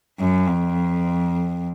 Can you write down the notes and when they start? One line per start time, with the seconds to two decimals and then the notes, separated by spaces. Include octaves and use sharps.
0.19 F#2
0.48 F2